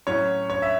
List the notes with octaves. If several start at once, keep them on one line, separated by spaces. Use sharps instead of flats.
A2 F#3 C#4 C#5
C#5
E5